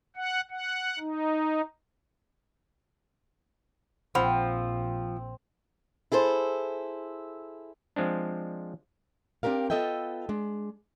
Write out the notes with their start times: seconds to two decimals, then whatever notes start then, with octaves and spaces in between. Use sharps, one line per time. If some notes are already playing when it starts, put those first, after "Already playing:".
0.16 F#5
0.51 F#5
0.99 D#4
4.15 A#1 F3 C4 F#5 B5
6.12 E4 G#4 A4 C5
7.96 F3 G#3 C4 D4
9.43 C4 D4 G4 A#4 F5
9.70 B3 F4 A4 D#5 E5 G5
10.29 G#3 D4